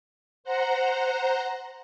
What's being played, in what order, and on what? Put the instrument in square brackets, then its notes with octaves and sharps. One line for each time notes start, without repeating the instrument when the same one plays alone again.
[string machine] C5 F#5 A#5